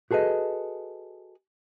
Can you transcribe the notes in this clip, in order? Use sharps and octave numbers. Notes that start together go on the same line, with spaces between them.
F#4 G#4 A4 B4 D#5